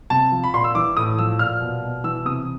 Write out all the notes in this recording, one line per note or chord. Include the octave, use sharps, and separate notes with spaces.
C3 A5
F3
B5
A#2 C6
E6
E3 D6
A2 D#6
F3 E6
A#2 F6
B2
B2
E3 E6
C3 D#6